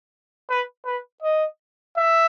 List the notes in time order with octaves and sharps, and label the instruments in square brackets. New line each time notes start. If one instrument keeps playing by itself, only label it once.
[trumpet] B4
B4
D#5
E5